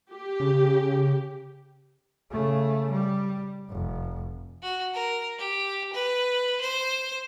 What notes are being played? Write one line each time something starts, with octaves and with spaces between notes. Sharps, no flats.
G4
C#3
C#3 A3
G3
F1
F#4
A#4
G4
B4
C5